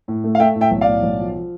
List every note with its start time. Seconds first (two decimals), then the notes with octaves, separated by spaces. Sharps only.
0.08 A2
0.24 A3
0.35 F5
0.40 A3 E5 G5
0.55 A2
0.61 E5 G5
0.71 B1
0.81 D5 F5
0.87 A2
1.03 B1
1.19 F3
1.35 F3